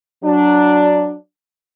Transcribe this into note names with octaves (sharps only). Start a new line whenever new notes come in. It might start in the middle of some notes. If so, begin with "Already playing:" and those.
F#3 D4